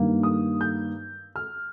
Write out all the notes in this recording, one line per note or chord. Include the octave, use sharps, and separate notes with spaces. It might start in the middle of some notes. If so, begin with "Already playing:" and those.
Already playing: G2 D#3 A#3
D#6
G6
F6